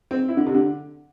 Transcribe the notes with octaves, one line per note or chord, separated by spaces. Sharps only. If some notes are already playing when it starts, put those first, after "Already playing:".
C4
E4
D3
C3
D3